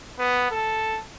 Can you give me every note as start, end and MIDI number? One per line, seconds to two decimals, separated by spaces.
0.19 0.46 59
0.51 0.99 69